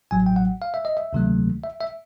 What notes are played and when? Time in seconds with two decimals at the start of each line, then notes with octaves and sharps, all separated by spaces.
0.11 A1 A2 F#3 G#5
0.26 G5
0.36 F#5
0.62 F5
0.74 E5
0.85 D#5
0.97 E5
1.13 D2 C3 D#3 F#3 A3
1.64 E5
1.81 E5